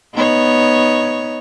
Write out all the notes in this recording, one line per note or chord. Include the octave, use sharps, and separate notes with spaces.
B3 D#4 C#5